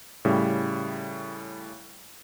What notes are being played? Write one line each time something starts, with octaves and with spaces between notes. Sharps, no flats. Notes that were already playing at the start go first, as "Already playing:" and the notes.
A2 C#3 G3